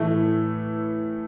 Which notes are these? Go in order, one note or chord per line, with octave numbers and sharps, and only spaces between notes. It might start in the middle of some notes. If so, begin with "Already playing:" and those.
Already playing: A2 E3 A3